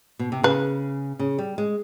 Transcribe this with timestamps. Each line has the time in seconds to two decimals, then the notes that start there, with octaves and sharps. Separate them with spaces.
0.19 B2
0.32 C3
0.43 C#3 B4
1.19 C#3
1.38 G3
1.58 G#3